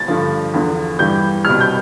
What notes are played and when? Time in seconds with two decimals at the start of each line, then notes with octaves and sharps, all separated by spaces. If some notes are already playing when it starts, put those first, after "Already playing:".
Already playing: A6
0.08 G2 D3 F3
0.54 E2 D3 F3
0.99 G2 E3 G3 G6
1.45 C2 B2 G3 F6
1.61 G6